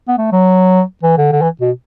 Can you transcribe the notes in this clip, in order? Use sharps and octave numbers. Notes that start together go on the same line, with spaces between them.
B3
A3
F#3
E3
D3
D3
E3
B2